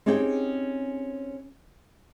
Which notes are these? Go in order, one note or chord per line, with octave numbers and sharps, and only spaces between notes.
C4 C#4 D#4 G4 G#4 G5